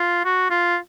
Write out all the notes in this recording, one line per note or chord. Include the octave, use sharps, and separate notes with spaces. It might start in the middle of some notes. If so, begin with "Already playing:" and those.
Already playing: F4
F#4
F4